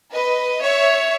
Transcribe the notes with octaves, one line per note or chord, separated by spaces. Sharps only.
B4 D#5
C#5 E5